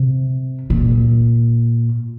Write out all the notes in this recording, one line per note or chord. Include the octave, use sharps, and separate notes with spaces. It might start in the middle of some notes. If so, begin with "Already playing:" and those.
Already playing: C3
A#2